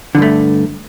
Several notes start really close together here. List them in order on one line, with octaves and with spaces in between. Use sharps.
D3 G2 A3